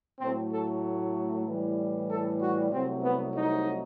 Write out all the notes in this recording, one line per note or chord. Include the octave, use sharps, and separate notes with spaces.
A2 F#3 A3 C4
A4
A2 E3 G3
A4
F#4
C2 C3 F#3 A3 C4
B3
D#4